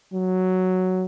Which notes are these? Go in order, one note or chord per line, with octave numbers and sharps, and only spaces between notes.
F#3